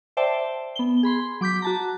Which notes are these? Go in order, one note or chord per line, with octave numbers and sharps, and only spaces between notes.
C5 D5 E5 G5 A5
B3 G7
G#4 B5 C6
F#3 D6 G6 B6
F#4 A5 A#5